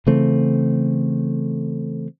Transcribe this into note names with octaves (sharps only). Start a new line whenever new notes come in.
C#3 E3 A3 C4